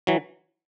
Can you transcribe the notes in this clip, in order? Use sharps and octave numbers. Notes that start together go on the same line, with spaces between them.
E3 F#3